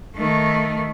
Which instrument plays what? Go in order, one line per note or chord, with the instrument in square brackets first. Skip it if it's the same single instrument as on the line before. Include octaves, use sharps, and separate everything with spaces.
[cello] D#3 A3